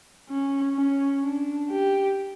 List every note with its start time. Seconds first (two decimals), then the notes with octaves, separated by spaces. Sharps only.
0.30 C#4
0.76 C#4
1.23 D4
1.70 G4